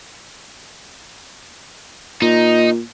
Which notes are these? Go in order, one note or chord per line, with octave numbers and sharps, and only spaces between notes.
A#2 D#4